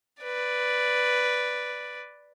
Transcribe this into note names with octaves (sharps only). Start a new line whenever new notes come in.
B4 D5